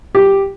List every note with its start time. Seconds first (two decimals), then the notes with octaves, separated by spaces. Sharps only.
0.15 G4